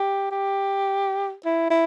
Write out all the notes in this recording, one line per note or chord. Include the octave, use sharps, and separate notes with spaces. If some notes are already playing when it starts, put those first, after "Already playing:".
Already playing: G4
G4
E4
E4